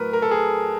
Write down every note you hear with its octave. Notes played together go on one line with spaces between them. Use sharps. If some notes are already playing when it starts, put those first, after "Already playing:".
Already playing: A2 F#3 A#4 B4
A#4
A4
G#4